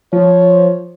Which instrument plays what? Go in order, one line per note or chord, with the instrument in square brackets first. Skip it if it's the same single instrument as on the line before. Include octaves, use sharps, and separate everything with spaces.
[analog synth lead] F3 [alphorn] C#5